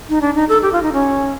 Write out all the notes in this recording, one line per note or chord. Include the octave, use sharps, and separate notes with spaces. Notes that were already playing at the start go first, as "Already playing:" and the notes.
D#4
D4
D#4
A4
G4
F4
D#4
C#4